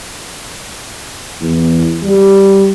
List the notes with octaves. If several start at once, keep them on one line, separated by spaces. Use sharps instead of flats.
E2
G3